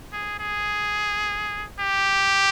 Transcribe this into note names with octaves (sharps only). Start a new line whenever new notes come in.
G#4
G#4
G4